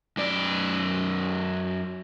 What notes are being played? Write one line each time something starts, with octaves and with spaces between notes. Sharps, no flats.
F#2 D5